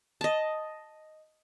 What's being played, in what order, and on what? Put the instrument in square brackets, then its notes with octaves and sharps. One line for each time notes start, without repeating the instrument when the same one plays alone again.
[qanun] D#5 A5